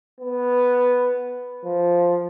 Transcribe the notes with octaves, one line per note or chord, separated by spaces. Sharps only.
B3
F3